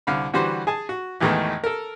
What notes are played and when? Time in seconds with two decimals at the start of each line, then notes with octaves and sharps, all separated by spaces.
0.07 C2 D3 F5 B5
0.33 D3 E3 G3 F#4 C5
0.67 G#4 G#5 A5
0.89 F#4
1.21 A1 E2 D#3 E3 G#3 A3
1.64 A4 A#4